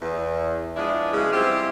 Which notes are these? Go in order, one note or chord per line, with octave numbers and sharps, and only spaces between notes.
E2
F3 G#3 B3 D4 E4
C#3 E3 F#3 G#3
G3 C4 E4 F4 G4